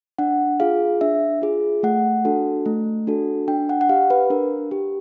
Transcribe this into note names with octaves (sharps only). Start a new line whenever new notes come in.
D4 F#5
F4 G#4 F5
D4 E5
F4 G#4
A3 F#5
D4 F#4 A4
A3
D4 F#4 A4
D4 G5
F#5
F#5
G4 F5
B4
D4 A#4
G4